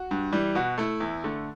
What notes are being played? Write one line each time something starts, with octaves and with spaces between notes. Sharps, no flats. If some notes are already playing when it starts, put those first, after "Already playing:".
Already playing: F#4
G2
E3 G3
B2 F#4
A3 E4
E2
D3 A3